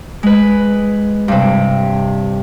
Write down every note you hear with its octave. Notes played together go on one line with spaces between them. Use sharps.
G#3 B4
G2 C3